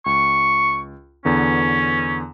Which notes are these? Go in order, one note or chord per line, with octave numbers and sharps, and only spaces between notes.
C#2 C#6
E2 D3 B3 C#4